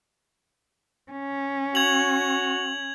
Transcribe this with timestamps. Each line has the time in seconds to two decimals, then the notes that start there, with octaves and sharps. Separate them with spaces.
1.12 C#4
1.75 F#4 G#6 F7 F#7